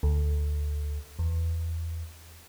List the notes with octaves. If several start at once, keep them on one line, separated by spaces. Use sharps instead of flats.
D2
E2